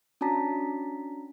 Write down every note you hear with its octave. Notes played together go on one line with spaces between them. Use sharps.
C#4 D4 F#4 A5 A#5 B6